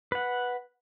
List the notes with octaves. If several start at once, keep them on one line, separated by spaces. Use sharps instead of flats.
B4 F#5